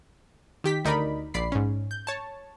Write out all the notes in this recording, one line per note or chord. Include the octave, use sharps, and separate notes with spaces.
D#3 G4 B6
D2 D#4 A#4 D5 B5
A#1 D5 B5 C7
G#2 C#4
G6
C#5 A5